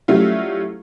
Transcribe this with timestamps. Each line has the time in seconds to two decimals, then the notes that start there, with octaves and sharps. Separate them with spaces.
0.08 F#3 G3 A3 C#4 E4 F4